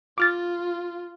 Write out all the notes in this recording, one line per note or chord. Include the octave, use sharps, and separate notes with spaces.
F4 D6 F6 A6